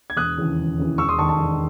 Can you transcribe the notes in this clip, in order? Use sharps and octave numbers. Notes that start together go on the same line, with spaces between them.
G#6
E1 D#6 F#6
D#2 C#3 E3
E1
D#2 C#3 E3
E1 C#6 E6
C6 D#6
D#2 D#3 A5 C#6
A5 C#6
E1